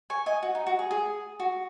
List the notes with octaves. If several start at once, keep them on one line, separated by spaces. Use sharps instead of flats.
G#5 C#6
D#5 G#5
F#4
D#4
F#4
G#4
G#4
F#4